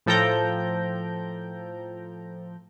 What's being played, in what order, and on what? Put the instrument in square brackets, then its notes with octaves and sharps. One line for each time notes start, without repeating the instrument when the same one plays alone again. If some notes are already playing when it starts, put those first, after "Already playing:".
[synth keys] A2 F3 A4 G5 A#5 G6